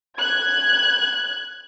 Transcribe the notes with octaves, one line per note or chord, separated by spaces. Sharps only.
F#6 G#6